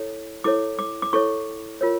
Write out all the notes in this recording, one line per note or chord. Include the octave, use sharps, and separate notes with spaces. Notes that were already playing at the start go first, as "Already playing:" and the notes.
Already playing: E4 A4 C#5
E4 A4 C#5 D6
D6
D6
E4 A4 C#5 C#6
F4 A#4 C#5